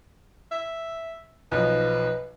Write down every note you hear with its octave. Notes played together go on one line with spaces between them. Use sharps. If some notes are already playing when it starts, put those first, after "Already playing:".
E5
B1 F3 D#4 B4